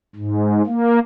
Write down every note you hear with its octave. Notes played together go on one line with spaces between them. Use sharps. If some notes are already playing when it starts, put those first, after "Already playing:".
G#2
A#3